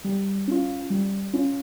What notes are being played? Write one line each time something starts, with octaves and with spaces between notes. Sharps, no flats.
G3
C#4 F4
G3
C#4 F4